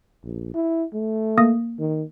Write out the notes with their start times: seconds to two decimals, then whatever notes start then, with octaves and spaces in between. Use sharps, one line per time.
0.24 A#1
0.54 E4
0.94 A3
1.38 A#3 D#6 A#6
1.79 D#3